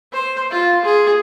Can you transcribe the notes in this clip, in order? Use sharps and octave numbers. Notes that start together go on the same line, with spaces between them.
C5
F4
G#4